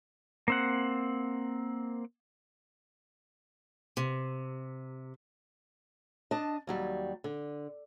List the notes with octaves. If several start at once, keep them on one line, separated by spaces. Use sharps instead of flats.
A#3 C4 F#5
C3
D4 D#5 A5
D#2 F#3 G3
D3